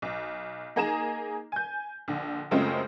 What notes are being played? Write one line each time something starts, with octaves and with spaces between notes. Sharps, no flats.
B1
A#3 D#4 G#4 G#5 A#5 E7
G#5 G6
A#1 D3
F#2 C#3 G#3 A3 C4 F4